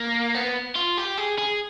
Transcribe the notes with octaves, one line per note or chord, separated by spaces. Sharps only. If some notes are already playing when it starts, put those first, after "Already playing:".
Already playing: A#3
B3
F4
G4
G#4
G#4